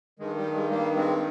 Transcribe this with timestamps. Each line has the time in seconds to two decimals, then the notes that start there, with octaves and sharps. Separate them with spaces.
0.19 G2 D#3 G#3
0.36 G3
0.54 G#3
0.71 G3 A#3
0.96 G#3 C4